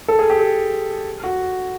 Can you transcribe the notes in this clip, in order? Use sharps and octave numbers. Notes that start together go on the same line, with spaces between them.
A4
G#4
G4
G#4
F#4